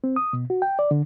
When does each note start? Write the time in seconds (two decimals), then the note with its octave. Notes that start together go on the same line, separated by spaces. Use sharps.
0.04 C4
0.16 D#6
0.33 B2
0.50 F#4
0.62 G5
0.79 D5
0.91 D3